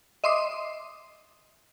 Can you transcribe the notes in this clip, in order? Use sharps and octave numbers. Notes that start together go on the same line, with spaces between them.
D#5 E5 C6 D6 D#6 C7